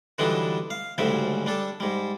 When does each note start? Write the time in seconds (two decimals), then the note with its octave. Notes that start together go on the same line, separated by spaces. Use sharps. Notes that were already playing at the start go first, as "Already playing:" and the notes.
0.18 D3 E3 F#3 G3 D4 D#4
0.70 F5
0.98 D2 G#2 C#3 F#3 G3 E5
1.46 G3 D4 A4
1.80 G#2 G3